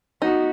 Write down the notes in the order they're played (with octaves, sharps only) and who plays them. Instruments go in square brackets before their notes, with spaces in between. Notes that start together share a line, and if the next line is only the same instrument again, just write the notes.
[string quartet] B3 F#4 [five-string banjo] D#4